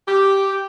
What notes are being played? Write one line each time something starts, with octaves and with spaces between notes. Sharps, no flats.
G4